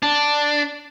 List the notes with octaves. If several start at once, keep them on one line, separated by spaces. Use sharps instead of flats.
D4